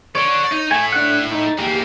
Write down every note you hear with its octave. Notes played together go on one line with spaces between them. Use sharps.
C#5 D5 F#5
D#4
A2 A3 G#5
D4 F#5
D#4
E2 A#3 G4